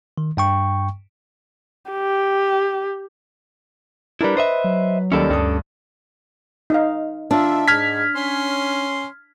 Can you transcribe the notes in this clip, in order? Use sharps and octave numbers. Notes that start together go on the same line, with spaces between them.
D#3
G2 G5 C#6
G4
G3 D4 E4 A#4 B4
B4 C5 D#5 E5
F#3
D#2 D#3 G3 C#4 A4 D5
D2 G2 D#6
D#4 D#5 F5
D#3 D4 F4 E5
G#2 F6 G#6 B6
C#4 C6